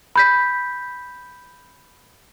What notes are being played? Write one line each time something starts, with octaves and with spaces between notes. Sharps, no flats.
B5 G6 B6